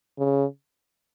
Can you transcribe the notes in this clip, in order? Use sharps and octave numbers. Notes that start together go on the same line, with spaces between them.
C#3